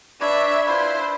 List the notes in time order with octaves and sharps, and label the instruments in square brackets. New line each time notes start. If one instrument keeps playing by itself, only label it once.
[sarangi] D4 [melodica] B4 C#5 D5 [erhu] E5
[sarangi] D4 [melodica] E4 F4 B4 [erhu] C5